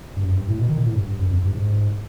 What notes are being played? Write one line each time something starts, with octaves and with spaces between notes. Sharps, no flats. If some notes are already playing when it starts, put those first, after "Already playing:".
G2
F#2
G2
A2
B2
D#3
A#2
A2
G2
G2
F#2
F2
G2
G#2